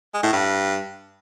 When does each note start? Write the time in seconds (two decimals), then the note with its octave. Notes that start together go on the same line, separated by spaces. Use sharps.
0.14 G#3
0.23 A2
0.33 G2